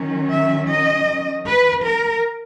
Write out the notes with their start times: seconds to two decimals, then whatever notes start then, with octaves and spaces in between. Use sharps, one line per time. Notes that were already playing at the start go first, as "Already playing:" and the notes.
Already playing: D#3 F#3 C#4
0.31 E5
0.69 D#5
1.47 B4
1.85 A#4